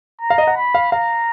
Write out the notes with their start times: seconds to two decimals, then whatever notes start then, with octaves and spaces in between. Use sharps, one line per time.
0.21 A#5
0.30 F5
0.38 D#5
0.47 F#5
0.56 B5
0.75 F5
0.92 F5 A#5